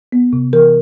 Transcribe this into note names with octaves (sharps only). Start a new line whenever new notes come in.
B3
C3
E3 A#4